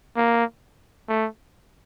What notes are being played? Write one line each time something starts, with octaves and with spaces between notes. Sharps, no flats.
A#3
A3